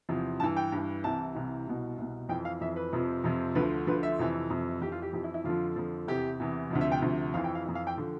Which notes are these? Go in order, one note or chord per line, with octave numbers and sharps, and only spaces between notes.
E2 C3 F3
G2 E3 A5
G5
G2 E3
C2 C3 E3 A5
C2 C3 E3
C2 B2
C2 B2
F2 E3 G5
F5
F2 E3 E5
B4
F2 C3 F3
F2 C3 F3
D2 D3 F3 B4
D2 D3 F3 B4
E5
F2 C3 E3
F2 C3 E3
F2 E3 G4
F4
G4
F2 E3 G4
E4
E4
F2 D3 F3 F4
F2 D3 F3
E2 C3 E3 G4
E2 C3 E3
D2 C3 F3
E5
G5
D2 C3 F3
F2 E3 F5
G5
F5
F2 E3
F5
G5
D3 F3